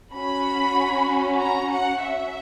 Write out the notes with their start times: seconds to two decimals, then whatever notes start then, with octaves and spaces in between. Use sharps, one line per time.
0.13 C#4 F#4 B5
1.40 A#5
1.71 F#5
2.02 E5